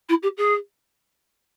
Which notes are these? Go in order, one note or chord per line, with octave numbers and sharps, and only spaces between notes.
E4
G4
G#4